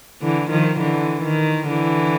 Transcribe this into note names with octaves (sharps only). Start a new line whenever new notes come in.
D3 E3
D#3 F3
D3 E3
D#3
D3 E3